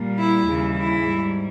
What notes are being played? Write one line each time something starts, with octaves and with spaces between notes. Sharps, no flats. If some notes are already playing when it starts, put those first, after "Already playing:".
Already playing: A#2 G3
E4
D#2 C#3 E3 G3
E4
G#2 G3